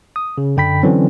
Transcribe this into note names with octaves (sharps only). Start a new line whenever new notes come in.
D#6
C#3
F#2 D3 G5 B5 B6
D3 E3 F#3 C4 C#4